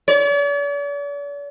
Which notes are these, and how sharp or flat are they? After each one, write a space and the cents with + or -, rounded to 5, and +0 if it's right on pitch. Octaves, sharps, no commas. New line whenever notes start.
D5 -45